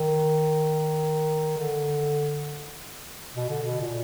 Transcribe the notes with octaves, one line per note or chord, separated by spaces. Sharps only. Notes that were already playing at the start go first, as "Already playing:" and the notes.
Already playing: D#3
D3
B2
D3
B2
A#2